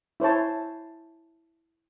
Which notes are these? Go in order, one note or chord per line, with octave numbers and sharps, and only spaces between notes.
E4 C5 C#5 A5